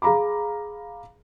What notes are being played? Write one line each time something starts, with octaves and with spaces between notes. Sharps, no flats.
G#4 F5 A#5 B5 D6